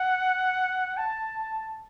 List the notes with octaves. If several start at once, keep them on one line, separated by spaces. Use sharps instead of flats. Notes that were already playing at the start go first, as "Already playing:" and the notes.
Already playing: F#5
A5